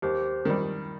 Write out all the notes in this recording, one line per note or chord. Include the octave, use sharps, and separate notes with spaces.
D#2 G4 C5
D#3 G3